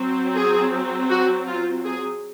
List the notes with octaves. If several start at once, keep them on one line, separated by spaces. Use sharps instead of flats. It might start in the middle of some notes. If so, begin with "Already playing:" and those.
Already playing: F#3 C4
G#4
F#4
F4
G#4